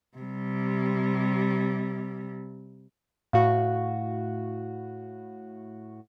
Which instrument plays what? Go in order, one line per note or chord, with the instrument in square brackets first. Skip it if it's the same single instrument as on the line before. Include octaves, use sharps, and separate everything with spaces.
[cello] C3 G3
[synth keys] A2 F#4 [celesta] F5